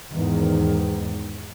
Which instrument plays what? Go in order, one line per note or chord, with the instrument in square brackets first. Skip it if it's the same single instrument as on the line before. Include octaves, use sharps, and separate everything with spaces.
[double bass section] E2 G#2 D#3